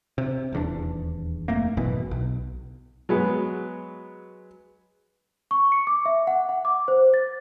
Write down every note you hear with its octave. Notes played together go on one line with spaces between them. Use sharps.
C3
D#1 E2 D4
F1 F2 A3 A#3
G#1 F#2 B2 E3
B1
F#3 G#3 B3
C#6
C#7
D6
E5
F#5
F#5
D6
C5
A6